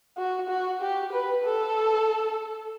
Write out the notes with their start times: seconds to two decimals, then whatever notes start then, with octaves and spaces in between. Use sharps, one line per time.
0.17 F#4
0.49 F#4
0.81 G4
1.12 B4
1.44 A4